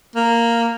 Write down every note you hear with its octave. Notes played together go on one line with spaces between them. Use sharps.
A#3